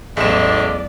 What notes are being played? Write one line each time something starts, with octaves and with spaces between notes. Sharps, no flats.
A1 E2 F#3 G#3 A3 D5 E7